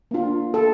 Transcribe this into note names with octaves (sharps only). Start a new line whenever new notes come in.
A#3 D4 F4
A4